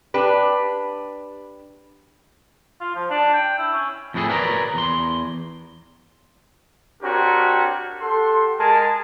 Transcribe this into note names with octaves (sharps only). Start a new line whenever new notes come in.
D4 G4 B4
F4
F3
D4
G5
E4
C#4
F2 A2 A3 D#4 G#4 A4
A#4 B4 C#5 D5 G5 A#5
E2 C6
C4 D4 F#4 G4 A#4 C#5
G4 A4 F#5 C6
G#3 G#4 A#4 A5